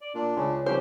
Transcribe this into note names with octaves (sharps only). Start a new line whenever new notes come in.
D5
A#2 D4
C#2 C#3
C2 F3 G4 C5